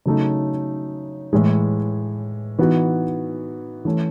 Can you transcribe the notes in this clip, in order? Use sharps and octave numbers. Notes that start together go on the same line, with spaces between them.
C#3 F#3 A3 D#4
A2 E3 G#3
E3 B3 D#4 F#4
E3 A3 C#4